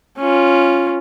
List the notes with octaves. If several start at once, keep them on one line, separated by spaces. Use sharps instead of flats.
C#4 F4